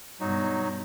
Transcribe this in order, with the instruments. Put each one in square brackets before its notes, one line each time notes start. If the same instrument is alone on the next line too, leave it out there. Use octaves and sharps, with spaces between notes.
[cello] G2 B2 [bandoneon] F#3 D#4 F#4